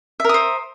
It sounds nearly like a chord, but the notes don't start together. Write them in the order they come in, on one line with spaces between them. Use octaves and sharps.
E5 A#4 D#6 C5